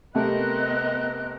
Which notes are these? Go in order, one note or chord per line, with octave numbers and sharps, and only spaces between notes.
C3 A3 B3 C4 A#4 D#5 F#6